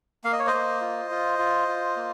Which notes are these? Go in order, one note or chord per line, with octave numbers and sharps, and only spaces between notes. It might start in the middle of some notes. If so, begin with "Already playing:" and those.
A#3 F5
D#5
C#5
C5 D#5
A#3
F4
F4
F4
F4
A#3